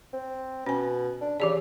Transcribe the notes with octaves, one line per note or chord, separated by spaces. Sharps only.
C4
B2 C#4 G#5
D4
C#3 E3 G4 D5